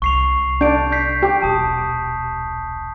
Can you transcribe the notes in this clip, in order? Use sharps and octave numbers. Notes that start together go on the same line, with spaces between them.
C2 C#6 C7 F7
D4 G6 D7
G6 B6 C7
G4
D#1 B1 A5 D#6